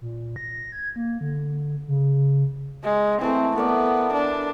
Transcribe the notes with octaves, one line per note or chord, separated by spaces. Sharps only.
A#2
A#6
G#6
A#3
D3
C#3
G#3
E3 A3 C4 E4
B3 A4 A#4 D5
D4